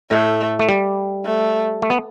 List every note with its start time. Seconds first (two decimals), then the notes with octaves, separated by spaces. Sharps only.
0.10 A2 A3
0.59 A3
0.69 G3
1.25 A3
1.82 A3
1.90 B3